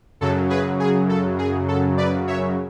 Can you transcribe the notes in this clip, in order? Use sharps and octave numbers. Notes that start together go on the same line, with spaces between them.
F#2 C#3 F#3 A4
G#4 B4
G#4
A4
G#4
A4
B4 D5
C#5 E5